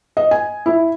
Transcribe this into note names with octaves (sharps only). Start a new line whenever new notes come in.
D#5
G#5
E4